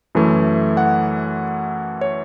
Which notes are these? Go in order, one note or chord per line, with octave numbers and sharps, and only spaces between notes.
F#2 E3 A3
F#5
C#5